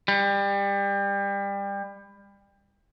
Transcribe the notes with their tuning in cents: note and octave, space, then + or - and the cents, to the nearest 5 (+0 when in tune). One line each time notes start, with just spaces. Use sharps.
G3 +25